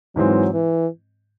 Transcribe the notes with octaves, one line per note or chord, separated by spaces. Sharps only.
G#2 E3 F#3 G#3 C4
E3